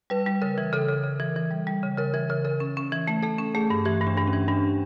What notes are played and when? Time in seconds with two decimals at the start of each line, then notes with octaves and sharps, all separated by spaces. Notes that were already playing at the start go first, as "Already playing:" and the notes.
0.10 G3 B4
0.26 G3
0.42 C#3 A#4
0.58 E3
0.73 C#3 A4
0.88 C#3
1.04 C#3
1.20 E3
1.36 E3
1.51 G3
1.67 G3
1.83 C#3
1.98 C#3 A#4
2.14 E3 A#4
2.30 C#3 A#4
2.45 C#3 A#4
2.60 C#4
2.77 C#4
2.92 E3
3.07 A3
3.22 A3 A4
3.39 C#4
3.55 A3 G#4
3.70 G2
3.85 E3 G4
4.02 G2
4.07 D4
4.17 G2
4.27 C#4
4.33 E3
4.48 G2 D4